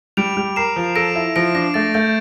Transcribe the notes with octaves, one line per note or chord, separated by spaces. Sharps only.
G3 D7 F7
G3
A#4 C7 E7
F3
A4 A#6 D7
E4
F3 A#6 D7
D4 A#6
A3 A6
A3 G6